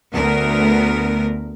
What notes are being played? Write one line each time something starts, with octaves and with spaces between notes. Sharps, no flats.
D2 B3 A#4